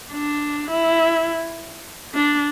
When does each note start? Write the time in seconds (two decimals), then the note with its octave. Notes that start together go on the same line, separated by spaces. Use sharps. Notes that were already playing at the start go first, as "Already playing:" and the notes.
0.12 D4
0.70 E4
2.15 D4